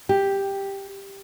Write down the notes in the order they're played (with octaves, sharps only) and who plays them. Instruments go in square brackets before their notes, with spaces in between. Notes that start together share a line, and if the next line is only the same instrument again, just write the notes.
[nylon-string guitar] G4